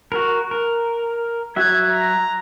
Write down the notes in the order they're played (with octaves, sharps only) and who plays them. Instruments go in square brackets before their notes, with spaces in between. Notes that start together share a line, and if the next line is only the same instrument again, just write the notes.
[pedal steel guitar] F#4 A#4
A#4
[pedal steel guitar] F#3 F#4 E5 [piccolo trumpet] G#6
[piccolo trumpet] A#5